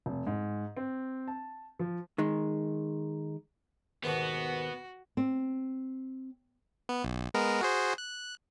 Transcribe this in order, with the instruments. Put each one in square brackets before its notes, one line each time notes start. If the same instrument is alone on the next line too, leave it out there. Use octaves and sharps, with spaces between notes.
[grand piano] F1
G#2
C4
A5
F3
[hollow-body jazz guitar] D#3 G#3
[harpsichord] D#2 G#2 B2 [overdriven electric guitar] B3 [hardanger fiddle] F#4
[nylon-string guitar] C4
[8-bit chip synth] B3
B1
G#3 B3 A#4
F#4 G#4 C5
F#6